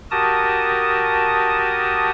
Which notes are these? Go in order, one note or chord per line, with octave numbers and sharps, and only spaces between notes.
F#4 G4 A#4 A5 D#6